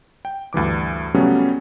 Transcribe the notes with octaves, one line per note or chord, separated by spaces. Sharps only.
G5
D2 G2 E3 D6
C#3 F#3 G3 A3 B3 C#4